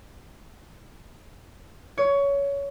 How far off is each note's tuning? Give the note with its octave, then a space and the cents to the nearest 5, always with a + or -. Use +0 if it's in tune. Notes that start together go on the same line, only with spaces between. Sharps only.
C#5 +20